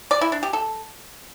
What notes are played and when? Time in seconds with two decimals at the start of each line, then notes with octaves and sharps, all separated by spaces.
0.11 D5
0.21 E4
0.32 D4
0.43 G4
0.53 A4